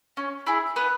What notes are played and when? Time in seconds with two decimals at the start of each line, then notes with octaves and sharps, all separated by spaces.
0.17 C#4
0.47 E4 G#4
0.76 B3 B4